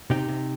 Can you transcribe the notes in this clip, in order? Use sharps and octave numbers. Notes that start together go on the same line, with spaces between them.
C3 D#4 G4
C3